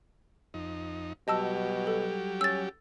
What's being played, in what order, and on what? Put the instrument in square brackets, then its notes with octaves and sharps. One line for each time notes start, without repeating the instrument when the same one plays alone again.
[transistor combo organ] F2 D#4
[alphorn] B2 [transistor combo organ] F#3 G3 G4 [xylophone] D#5 A5 E6
[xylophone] A4
[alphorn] C#4 [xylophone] E6 A6